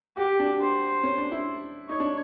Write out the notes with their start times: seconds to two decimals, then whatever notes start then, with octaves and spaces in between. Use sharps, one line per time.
0.17 F#4 G4
0.39 D4
0.61 C5
1.03 C#4
1.18 D4
1.32 E4
1.89 D#4 C#5
2.00 D4